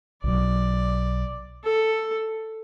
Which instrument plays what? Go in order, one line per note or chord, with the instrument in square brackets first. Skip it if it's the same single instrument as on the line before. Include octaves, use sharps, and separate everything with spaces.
[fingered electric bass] B1 B2 F#3 [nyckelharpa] D5
[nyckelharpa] A4